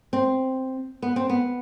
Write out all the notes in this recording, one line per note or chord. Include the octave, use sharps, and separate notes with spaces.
C4
B3
C4
B3